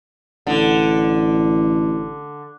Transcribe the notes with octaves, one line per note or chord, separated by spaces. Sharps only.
A1 D3